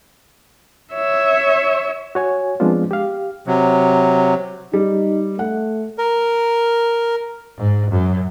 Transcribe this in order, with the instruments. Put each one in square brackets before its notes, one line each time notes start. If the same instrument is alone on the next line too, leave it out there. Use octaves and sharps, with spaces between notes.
[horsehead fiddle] C#5 E5
[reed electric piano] F#4 C#5 G#5
F3 G#3 B3 C4 D4 F4
G4 F5
[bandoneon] C3 F#3
[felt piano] G3 [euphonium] D#4
[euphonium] A3 [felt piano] F#5
[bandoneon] A#4
[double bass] G#2
F#2